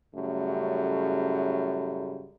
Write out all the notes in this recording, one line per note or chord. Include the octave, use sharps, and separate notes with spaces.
F#2 A2 C#3 G3 A3